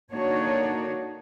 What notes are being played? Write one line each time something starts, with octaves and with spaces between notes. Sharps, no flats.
D3 A#3 D4 D#4 F#4 C#5